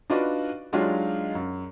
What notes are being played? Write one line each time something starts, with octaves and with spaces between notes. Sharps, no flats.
D4 D#4 F4 F#4 B4 D5
F#3 G#3 D4 D#4 F4 G4
F#2